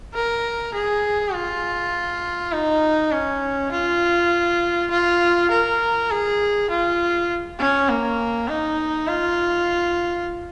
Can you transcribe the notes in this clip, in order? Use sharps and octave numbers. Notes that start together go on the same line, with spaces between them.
A#4
G#4
F4
D#4
C#4
F4
F4
A#4
G#4
F4
C#4
A#3
D#4
F4